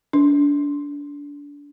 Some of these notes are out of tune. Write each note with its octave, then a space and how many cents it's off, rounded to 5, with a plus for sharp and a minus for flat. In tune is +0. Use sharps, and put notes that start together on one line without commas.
D4 -25